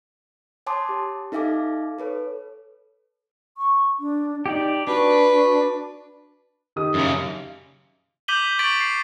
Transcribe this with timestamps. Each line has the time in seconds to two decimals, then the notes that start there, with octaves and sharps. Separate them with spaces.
0.66 C#5 G#5 A5 C6 D6 D#6
0.89 G4
1.32 D#4 A4 E5 F5 G#5 D6
1.99 A4 B4 C#5
3.58 C#6
4.00 D4
4.46 D#4 G4 D5
4.87 D4 F#4 B4
5.30 F#4
6.76 D#3 G4 D#6
6.94 F#2 C#3
8.28 D6 G6 B6 D#7 F#7 G7
8.59 C#6 A6 B6 D7 F#7
8.81 C7